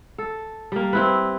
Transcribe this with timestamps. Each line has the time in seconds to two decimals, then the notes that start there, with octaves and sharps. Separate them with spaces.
0.18 A4
0.72 G3 A#3
0.93 C4 E4 B4